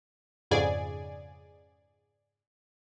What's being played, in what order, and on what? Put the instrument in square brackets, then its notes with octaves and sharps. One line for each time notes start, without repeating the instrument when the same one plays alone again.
[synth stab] F2 G#2 C#3 G#4 D5 G#5